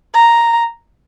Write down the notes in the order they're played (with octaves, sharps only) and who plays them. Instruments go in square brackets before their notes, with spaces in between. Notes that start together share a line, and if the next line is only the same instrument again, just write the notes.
[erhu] A#5